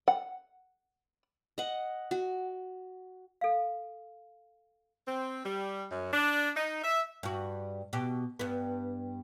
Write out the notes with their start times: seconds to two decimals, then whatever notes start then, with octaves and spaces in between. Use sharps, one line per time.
0.08 F#5
1.58 D#5 F#5
2.11 F#4
3.41 A4 F5
5.08 C4
5.45 G3
5.90 F#2
6.12 D4
6.57 D#4
6.83 E5
7.23 G2 F#4
7.93 B2 G4
8.39 G2 B3